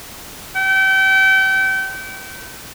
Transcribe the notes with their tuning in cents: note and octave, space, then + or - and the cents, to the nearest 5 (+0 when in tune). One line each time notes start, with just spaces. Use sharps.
G5 -35